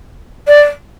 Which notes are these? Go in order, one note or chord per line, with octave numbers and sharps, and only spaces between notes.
D5